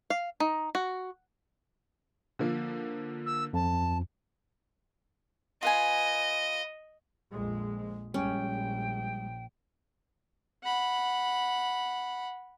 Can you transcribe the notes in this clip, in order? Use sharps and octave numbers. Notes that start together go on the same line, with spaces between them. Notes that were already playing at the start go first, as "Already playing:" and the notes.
F5
D#4
F#4
D3 F3 A#3
E6
F2 A5
F4 B4 D#5 G#5
A#1 F2 G#3
A#1 G3 G#3 C#4 G5
F#5 B5